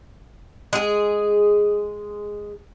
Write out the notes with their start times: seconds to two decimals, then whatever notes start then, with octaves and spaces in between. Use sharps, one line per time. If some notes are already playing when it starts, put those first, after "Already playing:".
0.73 G#3 G#4